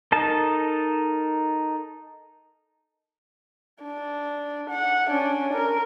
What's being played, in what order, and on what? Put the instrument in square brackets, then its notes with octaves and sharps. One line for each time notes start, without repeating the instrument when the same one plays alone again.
[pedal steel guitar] D#4 A4 A#4 A5
[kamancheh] D4
F#5
C#4 D4
A#4